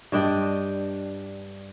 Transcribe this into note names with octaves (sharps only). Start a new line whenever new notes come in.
G2 D4 D#5 G5